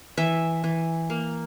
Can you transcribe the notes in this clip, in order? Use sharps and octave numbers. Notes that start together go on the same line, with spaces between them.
E3 E5
E3
A#3